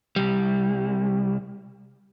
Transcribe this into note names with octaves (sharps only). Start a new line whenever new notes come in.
C2 G3